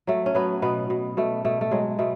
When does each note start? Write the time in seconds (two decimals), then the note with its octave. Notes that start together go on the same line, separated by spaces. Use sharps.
0.07 F#3 A3
0.26 C#4
0.35 F#3 B3
0.62 B2 B3
0.90 B2
1.17 B2 A3
1.45 B2 A3
1.61 A3
1.71 F#3 G#3
1.99 B2 A3